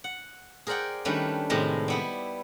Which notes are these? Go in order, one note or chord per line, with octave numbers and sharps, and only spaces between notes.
F#5
G#4 A#4 C5 D5 F#5 G5
D#3 G3 A3 C#4 D4 B4
A2 C3 D#3 G#3 D#5
G3 B3 E4